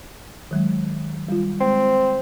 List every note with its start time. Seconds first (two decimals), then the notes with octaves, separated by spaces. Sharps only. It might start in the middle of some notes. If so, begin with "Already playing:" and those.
0.51 D#3 F#3 G#3
1.29 G3 F4
1.61 G#3 C4